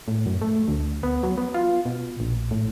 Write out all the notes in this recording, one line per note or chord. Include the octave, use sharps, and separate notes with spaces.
A2
F#2
A3
D2
B3
F#3
B3
F4
B2
A#1
A2